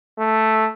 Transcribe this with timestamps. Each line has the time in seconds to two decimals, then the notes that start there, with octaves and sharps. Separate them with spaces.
0.19 A3